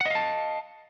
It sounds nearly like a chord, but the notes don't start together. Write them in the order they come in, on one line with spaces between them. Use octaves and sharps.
F#5 D#5 F5 A5